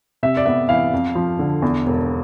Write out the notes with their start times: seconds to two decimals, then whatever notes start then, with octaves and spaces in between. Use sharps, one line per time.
0.23 C3 E5
0.37 D5
0.46 B3 E5
0.69 E3 F5
0.93 F2
1.15 F3
1.39 D3
1.62 E2
1.86 E1